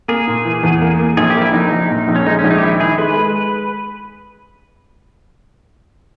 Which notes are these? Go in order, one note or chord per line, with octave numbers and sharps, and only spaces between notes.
A#3 G#4
A#2
E3
E2
A#3
A#3
A#1 G#4
G4
A#3
E4
A#1 D#4
A#1
A#2
A#1
C#4
G#3 D#4
C#4
A#1
D#4
G4
D#3 E4
D#3 G#4
G#3 B4
G#3